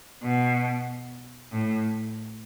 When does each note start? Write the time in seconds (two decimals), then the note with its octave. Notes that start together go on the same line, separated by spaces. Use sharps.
0.23 B2
1.52 A2